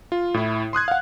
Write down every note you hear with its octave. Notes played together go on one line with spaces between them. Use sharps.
F4
A2 E4
C6 D#6 F#6 G#6
F5 F#5